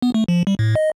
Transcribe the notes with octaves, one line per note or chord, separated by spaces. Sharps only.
B3
A3
F3
G3
A2
D#5